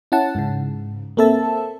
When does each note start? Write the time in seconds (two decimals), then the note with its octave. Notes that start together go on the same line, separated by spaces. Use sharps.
0.12 C#4 E4 F#5 A5
0.35 G#2 C#3
1.17 A#3 C4 A4 E5 A5